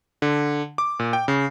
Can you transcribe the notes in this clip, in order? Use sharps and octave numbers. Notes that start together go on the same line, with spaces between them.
D3
D6
A#2
G5
C#3